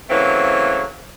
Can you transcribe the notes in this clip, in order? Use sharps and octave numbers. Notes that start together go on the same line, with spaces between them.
C#3 E3 F#3 A3 A#3 C4